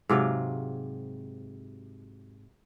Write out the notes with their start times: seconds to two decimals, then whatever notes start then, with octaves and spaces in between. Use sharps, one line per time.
0.09 G#2 C3 F#3 F5